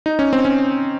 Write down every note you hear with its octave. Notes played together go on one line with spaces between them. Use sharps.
D#4
C#4
C4
C#4